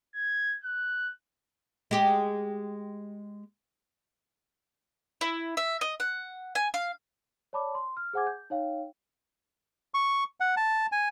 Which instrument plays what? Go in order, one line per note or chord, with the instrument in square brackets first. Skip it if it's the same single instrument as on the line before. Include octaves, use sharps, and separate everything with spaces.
[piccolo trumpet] G#6
F#6
[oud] G#3 G4
[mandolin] E4
E5
D#5
F#5
G#5
F5
[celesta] C#5 D5 A5 B5 D6
C6
F6
G#4 C5 F#5 G#5 D6 G#6
G6
D#4 C#5 F5 G5
[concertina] C#6
F#5
A5
G#5